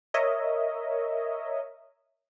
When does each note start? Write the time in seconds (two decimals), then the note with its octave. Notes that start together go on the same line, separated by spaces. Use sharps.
0.14 A#4 C#5 D#5 E5